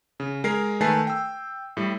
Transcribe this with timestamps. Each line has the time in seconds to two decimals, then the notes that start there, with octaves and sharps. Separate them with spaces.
0.20 C#3
0.44 G#3 A#4 G#5 C7
0.81 D#3 A3 B4 G#5 A5 C7
1.07 G5 E6
1.77 A2 G3